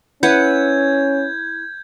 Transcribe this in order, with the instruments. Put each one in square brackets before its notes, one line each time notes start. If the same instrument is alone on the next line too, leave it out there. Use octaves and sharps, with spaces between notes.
[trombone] C#4 [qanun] E4 B4 F#5 [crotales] G6 G#6